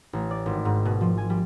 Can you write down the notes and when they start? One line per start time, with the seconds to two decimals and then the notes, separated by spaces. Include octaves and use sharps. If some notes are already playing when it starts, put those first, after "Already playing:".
0.13 A1
0.31 D5
0.46 G#1
0.65 G#2
0.85 B2
1.01 F3
1.18 G#5
1.30 G3